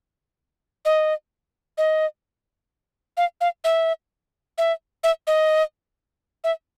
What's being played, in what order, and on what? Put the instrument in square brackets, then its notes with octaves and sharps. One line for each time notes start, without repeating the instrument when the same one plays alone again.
[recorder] D#5
D#5
F5
F5
E5
E5
E5
D#5
E5